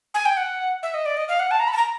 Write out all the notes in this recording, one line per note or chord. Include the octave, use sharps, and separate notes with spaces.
G#5
G5
F#5
E5
D#5
D5
D#5
F5
F#5
A5
A#5
B5
A5
A#5